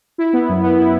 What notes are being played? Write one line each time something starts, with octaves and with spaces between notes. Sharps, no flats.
E4
B3
F#2
B3
E4